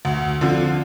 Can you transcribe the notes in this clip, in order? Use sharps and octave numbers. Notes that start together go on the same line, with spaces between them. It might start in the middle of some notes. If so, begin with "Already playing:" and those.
D2
D3 F3 C4 F4